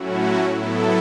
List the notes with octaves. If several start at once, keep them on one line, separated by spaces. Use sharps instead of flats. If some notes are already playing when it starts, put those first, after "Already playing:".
Already playing: A2 F#3 A3 C#4 E4 F#4
A2 F#3 B3 E4 A4